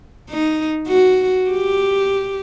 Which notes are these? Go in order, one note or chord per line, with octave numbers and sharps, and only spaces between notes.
D#4
F#4
G4